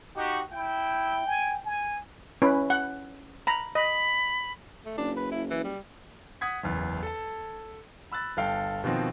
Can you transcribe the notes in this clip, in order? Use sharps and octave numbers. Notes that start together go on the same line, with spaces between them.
D#4 F#4 G4
E4 G5
G#5
G#5
C#4 E4 B4
F#5
A#5 B5
D#5 B5
A3
F#1 D4
B4
E4
E3
G3
F#5 D#6 G#6 B6
F#1 E2
A4 A5
B5 E6 F#6 A6
G1 A4 F5 G5
B2 D#3 F3 C4 F#4